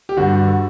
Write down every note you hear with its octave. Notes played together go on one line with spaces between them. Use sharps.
G4
G2 D3 F#4
D3